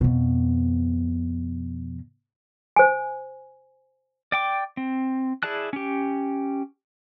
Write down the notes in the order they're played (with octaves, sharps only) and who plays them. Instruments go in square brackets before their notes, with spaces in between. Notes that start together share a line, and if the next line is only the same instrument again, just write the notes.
[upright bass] F2 B2
[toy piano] C5 G#5
[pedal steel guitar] D5 G5 D6
C4
E4 G#4 D5 A5 F#6
C#4 G4